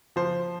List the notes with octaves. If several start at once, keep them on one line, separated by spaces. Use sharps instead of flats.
F3 C5